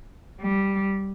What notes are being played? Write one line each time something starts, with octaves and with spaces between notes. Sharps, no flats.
G3